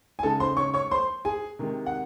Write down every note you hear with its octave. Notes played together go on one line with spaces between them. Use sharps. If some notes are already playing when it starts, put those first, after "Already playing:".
G#5
C#3 G#3 D#4 A4 A5
C5 C6
C#5 C#6
C#5 C#6
C5 C6
G#4 G#5
C3 D#3 G#3
F#5